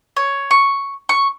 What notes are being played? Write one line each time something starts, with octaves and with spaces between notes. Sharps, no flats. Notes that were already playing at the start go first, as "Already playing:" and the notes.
C#5
C#6
C#6